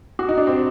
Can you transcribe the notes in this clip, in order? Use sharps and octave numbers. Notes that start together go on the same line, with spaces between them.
F#4
D#4
D4
C4